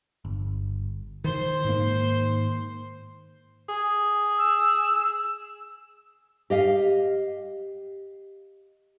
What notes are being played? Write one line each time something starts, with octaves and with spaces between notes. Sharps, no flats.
G1
D#3 C5 C6
G#2 D#3 A#3
G#4
E6
G4 D#5 F5